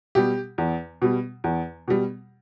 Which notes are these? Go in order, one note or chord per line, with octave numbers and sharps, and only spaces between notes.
B2 G3 G4
E2
B2 G3
E2
B2 G3